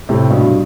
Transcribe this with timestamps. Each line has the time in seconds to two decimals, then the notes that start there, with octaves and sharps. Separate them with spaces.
0.09 A2 C3
0.30 G2 B2